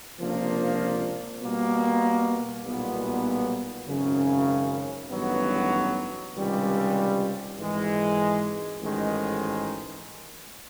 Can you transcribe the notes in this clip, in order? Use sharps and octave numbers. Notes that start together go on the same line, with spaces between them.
C#2 C3 F3 A#3 D4
B2 G3 A#3
B1 A#2 G3 B3
G#1 F#2 C#3
A1 G2 D#3 F#3 B3
C#2 C3 D#3 G3
G#1 G#2 E3 G#3
A1 G#2 D#3 G#3